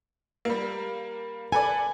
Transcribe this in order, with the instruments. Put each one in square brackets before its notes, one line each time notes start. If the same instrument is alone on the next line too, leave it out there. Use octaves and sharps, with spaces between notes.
[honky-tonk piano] G3 A#3
[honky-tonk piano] A4 B4 D5 [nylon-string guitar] G#5